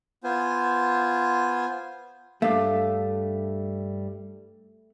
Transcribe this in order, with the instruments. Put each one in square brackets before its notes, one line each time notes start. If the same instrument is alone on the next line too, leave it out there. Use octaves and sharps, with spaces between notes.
[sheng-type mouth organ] B3 F4 C5 G#5
[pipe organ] G2 G3 [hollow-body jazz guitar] A3 [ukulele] D4 F5